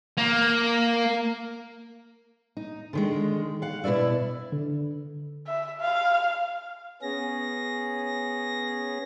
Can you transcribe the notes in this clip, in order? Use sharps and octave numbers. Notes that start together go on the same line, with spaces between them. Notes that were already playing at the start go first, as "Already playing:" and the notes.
A#3
D#4
D3 D#3 G#3
F5 F#5
B2 E4 B4 D5 E5
D3
E5
F5
B3 C#4 G#4 A#6